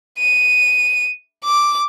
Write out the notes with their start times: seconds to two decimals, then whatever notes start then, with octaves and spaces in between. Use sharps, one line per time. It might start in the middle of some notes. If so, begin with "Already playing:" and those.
0.18 D#7
1.44 D6